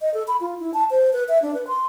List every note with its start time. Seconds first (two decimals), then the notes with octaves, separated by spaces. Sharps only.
0.01 D#5
0.14 A4
0.28 B5
0.41 F4
0.60 E4
0.74 A5
0.90 C5
1.13 B4
1.29 E5
1.42 D4
1.54 B4
1.68 C6